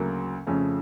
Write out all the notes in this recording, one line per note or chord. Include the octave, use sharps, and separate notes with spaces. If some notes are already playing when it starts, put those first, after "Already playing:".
Already playing: D2 C#3 F#3 A#3
F2 C#3 F3 A3 C#4